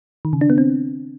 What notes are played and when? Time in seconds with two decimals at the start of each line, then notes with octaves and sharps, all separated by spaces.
0.25 D#3
0.33 C#3
0.41 D4
0.50 B3
0.58 C4